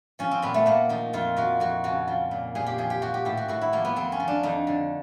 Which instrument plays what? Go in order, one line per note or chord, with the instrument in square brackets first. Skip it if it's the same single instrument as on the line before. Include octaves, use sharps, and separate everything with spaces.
[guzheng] F3 C#4
C4
A#2 B3
A3
A#2 A#3
F3 D#4
F2 F4
F3 F#4
F2 F#4
C#3 F#4
F3
A#2
A#2 G#4
G4
F3 G#4
G4
F3 F#4
G4
A2 G4
F#4
A2 F#4
E4
F3 A#3
B3
F2 C4
C#4
F3
D4
F2 D#4
D3